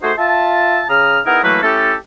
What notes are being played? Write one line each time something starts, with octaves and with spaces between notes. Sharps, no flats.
A3 D#4 F#4 G#4 C5
F4 E5 A5
C#3 A#5 D#6 F6
B3 D#4 E4 G#4 A#4
E3 F#3 A3 A#3 B4
A3 C#4 E4 G4 A4